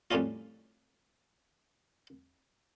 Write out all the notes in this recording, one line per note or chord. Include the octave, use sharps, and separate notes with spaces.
F2 A2 G3 C#4 D#4 F4